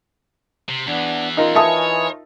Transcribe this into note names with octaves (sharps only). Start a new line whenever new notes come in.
C3
E2 E3 B3 D4
D#4 F4 A#4
E3 E4 C#5 E5 G#5 A5 D#6